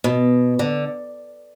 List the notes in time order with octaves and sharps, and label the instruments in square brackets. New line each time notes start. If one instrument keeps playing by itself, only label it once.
[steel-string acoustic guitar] B2
D3